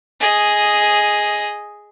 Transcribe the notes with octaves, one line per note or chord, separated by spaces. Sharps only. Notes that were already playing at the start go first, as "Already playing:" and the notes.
G#4 D#5